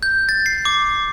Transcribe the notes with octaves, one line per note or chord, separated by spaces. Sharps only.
G6
A6
C7
D6